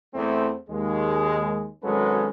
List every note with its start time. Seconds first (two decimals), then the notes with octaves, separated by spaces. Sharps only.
0.14 E2 A3 C4
0.70 D#2 G#3
1.84 G#1 F#3 G#3 C#4 A4 B4